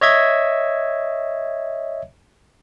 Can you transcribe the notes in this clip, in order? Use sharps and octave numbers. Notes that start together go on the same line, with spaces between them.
C#5 D#5 E5 G#6